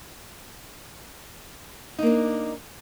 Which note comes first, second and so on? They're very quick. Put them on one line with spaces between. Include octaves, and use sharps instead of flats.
D#4 A#3 D4